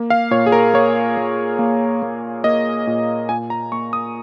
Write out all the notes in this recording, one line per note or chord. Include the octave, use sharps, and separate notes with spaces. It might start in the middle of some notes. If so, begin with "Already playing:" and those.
Already playing: A#3
F5
A#2 C#5
G#4
A#4
A#3 C#5
A#3
A#3
A#3
A#3 D#5
A#2
A#2 G#5
A#5
A#3 C#6
D#6